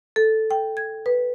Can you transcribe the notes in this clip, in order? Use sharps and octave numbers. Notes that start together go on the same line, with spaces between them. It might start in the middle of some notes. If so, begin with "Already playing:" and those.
A4
G5
G#6
B4